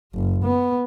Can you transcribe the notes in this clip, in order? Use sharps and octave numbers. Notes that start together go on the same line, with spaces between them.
F#1
B3